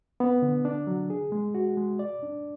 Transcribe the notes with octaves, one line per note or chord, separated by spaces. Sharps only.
B3
D3
D4
F#3
G#4
G#3
F#4
G#3
D5
D4